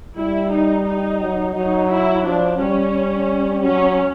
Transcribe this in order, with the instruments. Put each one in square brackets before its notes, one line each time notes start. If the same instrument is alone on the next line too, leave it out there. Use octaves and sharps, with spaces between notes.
[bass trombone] G3 [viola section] E4
[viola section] D#4
D#4
[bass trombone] F#3
[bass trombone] F#3 [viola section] D#4
[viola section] E4
[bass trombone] F3 [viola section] D4
[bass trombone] G3 [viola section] C#4
[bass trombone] F#3 [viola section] C#4